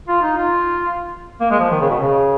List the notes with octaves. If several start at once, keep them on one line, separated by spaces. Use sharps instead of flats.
F4
D#4
F4
A#3
G#3
F3
D#3
C#3
B2
C#3